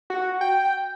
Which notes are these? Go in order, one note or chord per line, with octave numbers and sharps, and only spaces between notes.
F#4
G5